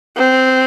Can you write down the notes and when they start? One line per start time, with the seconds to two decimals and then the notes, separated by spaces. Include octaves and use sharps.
0.17 C4